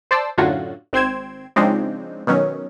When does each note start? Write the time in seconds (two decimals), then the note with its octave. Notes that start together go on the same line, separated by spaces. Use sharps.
0.11 C5 D5 A5 E6
0.38 F#2 A2 D3 F#3 F4 F#4
0.93 G#1 C4 G5 C6 G#6 E7
1.56 C#3 F3 G#3 C4 D4 D#4
2.27 B2 D#3 F#3 C#4